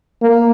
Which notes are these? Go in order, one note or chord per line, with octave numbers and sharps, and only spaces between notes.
A#3